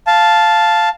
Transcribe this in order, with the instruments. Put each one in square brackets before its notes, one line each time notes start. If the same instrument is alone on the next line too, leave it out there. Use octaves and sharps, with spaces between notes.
[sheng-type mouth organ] F5 A5